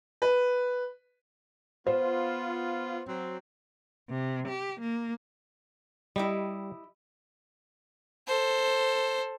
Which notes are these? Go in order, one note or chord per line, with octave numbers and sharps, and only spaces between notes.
B4
B3 F4 C5
F#3 C4
C3
G4
A#3
G3 E4 G4 D#5
A4 C5